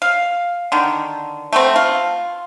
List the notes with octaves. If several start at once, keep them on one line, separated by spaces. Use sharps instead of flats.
F5
D3 D#3
A3 B3 C4
F4